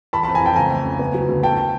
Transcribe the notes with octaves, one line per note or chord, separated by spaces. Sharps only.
E3 A5 B5
F2 A5 B5
G#5 A#5
F2 G5 A5
C#2 G#5 A#5
A3
C#3
B3
F#3
D2
A3 G5 A5